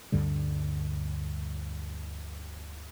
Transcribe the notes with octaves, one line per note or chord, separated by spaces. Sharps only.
D2 G2 D3 G3